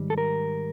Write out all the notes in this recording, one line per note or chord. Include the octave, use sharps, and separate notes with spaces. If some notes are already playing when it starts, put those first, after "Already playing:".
Already playing: G#2 D#3 G3
A4
A#4